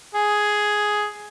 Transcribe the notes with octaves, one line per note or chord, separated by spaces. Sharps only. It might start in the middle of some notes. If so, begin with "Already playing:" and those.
G#4